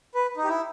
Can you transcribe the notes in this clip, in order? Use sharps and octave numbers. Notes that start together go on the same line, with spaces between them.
B4
D#4
G4
E4